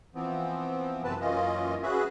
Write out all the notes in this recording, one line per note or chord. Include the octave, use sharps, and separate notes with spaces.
E3 F3 B3 C4
F#2 C3 E3 C4 B4 A5
F#2 E3 A#3 C#4 F4 D#5
C#4 F#4 G#4 B4 E5